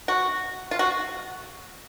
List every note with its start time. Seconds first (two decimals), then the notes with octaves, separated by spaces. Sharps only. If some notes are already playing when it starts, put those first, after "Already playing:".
0.08 F#4
0.71 F4
0.79 F#4